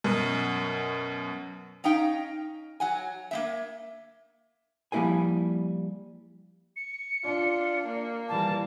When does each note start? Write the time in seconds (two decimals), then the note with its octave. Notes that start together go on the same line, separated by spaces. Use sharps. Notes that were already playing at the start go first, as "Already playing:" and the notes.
0.04 F#2 B2
1.84 C#4 D#4 F5 G5
2.80 F#3 F#5 G#5
3.31 A#3 B3 E5
4.92 F3 G3 A#3 E4 A4 G#5
6.76 C#7
7.24 D4 F4
7.87 A#3
8.29 E3 G3 A5